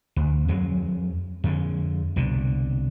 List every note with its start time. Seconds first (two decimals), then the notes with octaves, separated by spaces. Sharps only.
0.16 D2
0.48 F2 F#3 G#3
1.44 F2 D3 G#3
2.16 C2 B2 D3